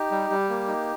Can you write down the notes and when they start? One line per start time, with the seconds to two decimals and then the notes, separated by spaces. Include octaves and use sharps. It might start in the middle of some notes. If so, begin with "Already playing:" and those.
Already playing: D#4 G4
0.11 G3
0.30 G3
0.49 A#3
0.67 D#4